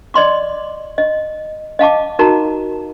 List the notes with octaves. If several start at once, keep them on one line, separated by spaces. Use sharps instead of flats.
D5 D#5 C6 D6
D#5
D#5 F5 A5 D6
D#4 F#4 A#4 A5 A#5